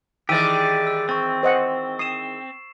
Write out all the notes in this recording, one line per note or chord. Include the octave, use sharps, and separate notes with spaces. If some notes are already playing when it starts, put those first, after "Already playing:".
D#3 E3 G#3 G4 D5 E6 D7 D#7
E6
C4 C#6 A6
C5 D#5 F#5
D#6 C7 E7